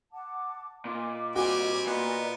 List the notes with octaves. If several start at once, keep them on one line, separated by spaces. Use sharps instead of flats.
F#5 A5 D6
A#2 D#5 D6
G3 C4 F#4 G#5
A#2 B3 D5 D#5 A#5